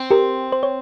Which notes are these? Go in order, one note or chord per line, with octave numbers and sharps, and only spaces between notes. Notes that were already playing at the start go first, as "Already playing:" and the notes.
Already playing: C4
G4 A#4
C5
C#5